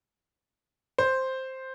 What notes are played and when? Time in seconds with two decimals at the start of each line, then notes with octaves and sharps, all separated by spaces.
0.98 C5